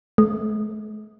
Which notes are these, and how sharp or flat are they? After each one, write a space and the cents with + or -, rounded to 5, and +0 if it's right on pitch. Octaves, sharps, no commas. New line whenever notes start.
A3 -45